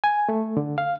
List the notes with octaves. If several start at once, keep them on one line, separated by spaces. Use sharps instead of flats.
G#5
A3
D3
F5